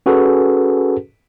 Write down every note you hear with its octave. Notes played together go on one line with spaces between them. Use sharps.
C#4 F#4 G#4 A4 B4